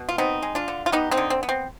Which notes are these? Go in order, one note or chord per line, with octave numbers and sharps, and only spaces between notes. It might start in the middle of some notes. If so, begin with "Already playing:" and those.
Already playing: B2
F4
B3 C4 D#4
G#3
D4 F4
D3
F4
B3 D#4 G4
C4 D#4
D3
C4
B3
C4